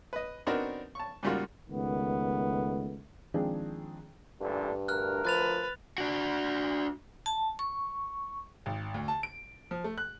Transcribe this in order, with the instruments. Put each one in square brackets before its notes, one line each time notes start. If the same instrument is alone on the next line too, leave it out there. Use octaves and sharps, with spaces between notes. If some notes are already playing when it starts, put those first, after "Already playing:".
[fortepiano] B4 D#5
B3 C4 D4 D#4 F#4 A#4
A5 C#6
G#2 C#3 G3 A#3 F4 F#4
[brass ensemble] C#2 D#3 A3 B3
[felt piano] D#3 F3 G#3 C4 D4 G#4
[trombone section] A1 A#2 D3 [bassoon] G2
[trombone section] D2 A#4 [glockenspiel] F6 F#6
[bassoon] F3 [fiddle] B4 [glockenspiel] F#6 A6 F7
[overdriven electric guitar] D4 F#4
[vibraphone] A5
C#6
[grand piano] G#1
D2
A5
D7
F3
A3
F#6